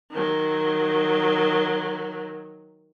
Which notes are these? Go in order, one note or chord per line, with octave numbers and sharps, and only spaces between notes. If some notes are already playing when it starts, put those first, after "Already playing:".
D#3 F#3